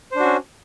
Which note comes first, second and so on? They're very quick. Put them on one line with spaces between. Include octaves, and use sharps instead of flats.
C5 D4 F#4 C#4